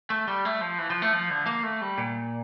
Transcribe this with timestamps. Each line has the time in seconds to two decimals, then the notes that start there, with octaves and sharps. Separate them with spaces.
0.10 A3
0.28 G3
0.45 A3
0.61 F3
0.78 E3
0.90 F3
1.02 A3
1.13 F3
1.30 D3
1.46 A#3
1.63 A3
1.81 G3
1.98 A#2